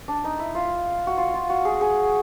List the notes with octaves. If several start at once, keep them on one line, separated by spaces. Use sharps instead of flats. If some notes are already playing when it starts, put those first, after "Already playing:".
D4
D#4
E4
F4
F#4
F4
F4
F#4
G#4
G#4